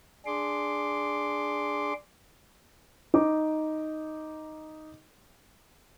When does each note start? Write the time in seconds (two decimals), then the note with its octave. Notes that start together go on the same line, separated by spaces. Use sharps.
0.26 D4 G#4 C6 D6
3.14 D#4 D6